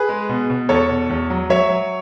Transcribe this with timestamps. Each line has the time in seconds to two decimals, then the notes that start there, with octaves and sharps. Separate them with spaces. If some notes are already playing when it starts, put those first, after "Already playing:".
Already playing: G#4 B4
0.09 G#3
0.29 B2
0.50 B2
0.69 E2 A4 C#5
0.89 B2
1.09 E2
1.30 F#3
1.50 F#3 C#5 E5
1.70 F#3